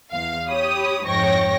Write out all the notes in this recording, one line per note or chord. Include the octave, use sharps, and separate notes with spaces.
E2 F5
G4 C#5 B5 D#6
F2 G#2 C#5 G5 C#6 A#6